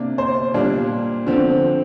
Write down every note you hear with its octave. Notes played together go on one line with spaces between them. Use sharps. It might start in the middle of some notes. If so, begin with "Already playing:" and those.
Already playing: C3 A#3 D4 D5
C5
A#2 G3 A#3 D4
D3 F3 C4